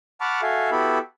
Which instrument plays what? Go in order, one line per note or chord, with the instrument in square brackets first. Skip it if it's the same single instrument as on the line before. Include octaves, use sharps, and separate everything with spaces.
[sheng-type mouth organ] F#5 A5 B5 C#6 D6 F6
F#4 A4 E5 F5 G#5
B3 E4 F#4 G4 A4 B5